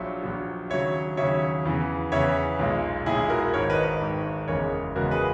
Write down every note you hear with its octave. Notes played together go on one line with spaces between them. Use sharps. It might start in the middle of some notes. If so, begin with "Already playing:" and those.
Already playing: A#1 A#2 F#3 C#5 E5
A#1 A#2 F#3
D#2 C#3 F#3 C#5 E5
D#2 C#3 F#3 C#5 E5
E2 C#3 E3
E2 C#3 E3 C#5 E5
B1 A#2 G#3
B1 A#2 G#3 E4 G#4
F#4 A#4
G#1 G#2 D#3 A#4 C#5
B4 D#5
B4 D#5
G#1 G#2 D#3
F#1 E2 C#3 G#3 A#4 C#5
F#1 E2 C#3 G#3 F#4 A#4
G#4 B4